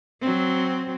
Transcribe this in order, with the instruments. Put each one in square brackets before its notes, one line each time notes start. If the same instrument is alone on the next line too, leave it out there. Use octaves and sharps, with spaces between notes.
[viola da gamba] F#3 C4